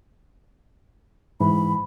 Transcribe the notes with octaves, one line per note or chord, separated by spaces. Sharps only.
G#2 E3 B5